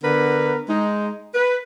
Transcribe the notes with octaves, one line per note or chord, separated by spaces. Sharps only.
D3 B3 A#4 B4
G#3 D#4
B4